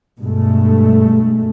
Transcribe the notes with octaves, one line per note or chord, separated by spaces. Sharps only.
G2 B2 G#3 A3